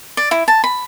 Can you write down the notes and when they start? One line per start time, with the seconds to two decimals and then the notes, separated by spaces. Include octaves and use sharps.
0.17 D5
0.31 E4
0.48 A5
0.64 B5